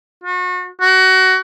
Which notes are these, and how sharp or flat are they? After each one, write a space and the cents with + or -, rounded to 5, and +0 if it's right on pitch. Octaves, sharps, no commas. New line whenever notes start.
F#4 -35
F#4 +20